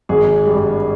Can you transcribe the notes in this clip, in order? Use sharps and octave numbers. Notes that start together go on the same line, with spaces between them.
G#1 G#4
G2 G3